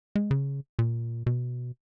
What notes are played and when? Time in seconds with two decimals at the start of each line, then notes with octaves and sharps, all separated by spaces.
0.16 G#3
0.31 C#3
0.79 A#2
1.26 B2